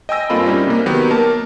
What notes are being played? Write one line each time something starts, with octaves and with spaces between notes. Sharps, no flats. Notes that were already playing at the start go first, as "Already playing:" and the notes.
D#5 G5 G#5 E6 A#6
G2 A#3 C4 F4 A4 B5
G3 A#3 C#4 D#4 E4
C3 A#3
D#3 F#3 B3 G4
A#3 A#4 A5